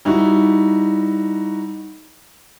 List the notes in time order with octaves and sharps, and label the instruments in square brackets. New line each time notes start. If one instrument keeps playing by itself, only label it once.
[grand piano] G3 D#4 E4 F#4